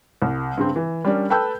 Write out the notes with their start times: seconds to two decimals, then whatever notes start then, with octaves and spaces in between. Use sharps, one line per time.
0.22 C2
0.57 G2 C#3 C4
0.76 E3
1.05 G3 C#4 D4 A#4
1.30 A4 B4 G5 A5 E6 G6